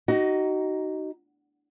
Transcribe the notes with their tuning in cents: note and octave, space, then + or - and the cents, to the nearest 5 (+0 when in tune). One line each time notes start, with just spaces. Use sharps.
D#4 +0 F#4 +30